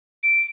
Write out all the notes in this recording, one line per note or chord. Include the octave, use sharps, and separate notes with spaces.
D7